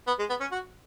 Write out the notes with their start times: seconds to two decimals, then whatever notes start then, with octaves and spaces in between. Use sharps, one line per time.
0.07 B3
0.19 G#3
0.29 B3
0.40 C#4
0.52 F#4